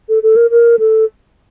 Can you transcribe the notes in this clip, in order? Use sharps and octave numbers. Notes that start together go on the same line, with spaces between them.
A4
A4
A#4
A#4
A4